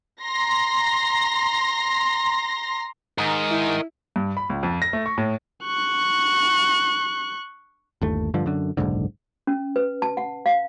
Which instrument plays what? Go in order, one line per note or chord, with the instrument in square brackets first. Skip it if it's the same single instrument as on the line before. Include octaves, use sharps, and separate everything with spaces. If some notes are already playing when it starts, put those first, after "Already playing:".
[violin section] A#5 C6 A#6
[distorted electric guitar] G#2 [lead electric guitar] A#4 D#5
[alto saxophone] E4
[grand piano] G2
B5
C#2
F2
A#6
A3
C#6
A2
[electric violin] C#6 F#6
[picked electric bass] G1 D#2 A3
G2 D3 F3
F#2 D3
F#1 B1 G#2 D3
[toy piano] C#4
B4
A5
F#5
F5